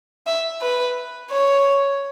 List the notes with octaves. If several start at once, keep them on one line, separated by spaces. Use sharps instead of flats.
E5
B4
C#5